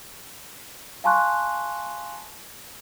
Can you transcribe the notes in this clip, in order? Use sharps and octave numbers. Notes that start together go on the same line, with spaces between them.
F5 G#5 A5 C6 C#6 F#6